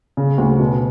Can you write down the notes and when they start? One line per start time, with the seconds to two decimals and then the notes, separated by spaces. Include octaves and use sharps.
0.17 C#3
0.38 D2
0.59 B2